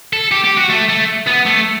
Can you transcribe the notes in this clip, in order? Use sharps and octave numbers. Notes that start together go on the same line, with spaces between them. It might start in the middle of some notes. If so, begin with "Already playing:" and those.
A4
G4
G4
F#4
A3
A3
B3
A3